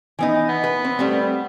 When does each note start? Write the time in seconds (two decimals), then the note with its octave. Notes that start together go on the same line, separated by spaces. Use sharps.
0.19 E3 B3 D#4
0.49 B3
0.64 B4
0.85 C4
0.99 G3 A3 C4